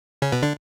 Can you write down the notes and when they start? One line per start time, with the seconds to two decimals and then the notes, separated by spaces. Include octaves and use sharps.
0.22 C#3 C#4
0.32 B2 B3
0.43 D3 D4